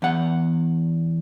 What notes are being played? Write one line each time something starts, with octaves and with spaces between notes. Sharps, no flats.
E2 F#5